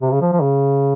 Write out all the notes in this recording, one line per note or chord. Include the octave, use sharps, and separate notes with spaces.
C3
C#3
F3
F3
C#3